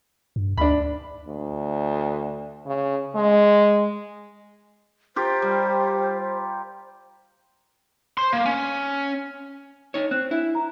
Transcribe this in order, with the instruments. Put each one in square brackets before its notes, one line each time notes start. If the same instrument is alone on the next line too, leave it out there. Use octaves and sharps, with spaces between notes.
[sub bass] G2
[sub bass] D2 [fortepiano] D4 B5
[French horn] D2
C#3
G#3
[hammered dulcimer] F4 G4 A#4 [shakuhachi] C5
[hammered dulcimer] G3
[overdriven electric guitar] C5 C6
A#3
C#4
[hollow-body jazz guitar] D#4 C#5
[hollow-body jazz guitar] C4 [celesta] F#6
[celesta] D4 [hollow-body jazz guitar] E4
[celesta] A#5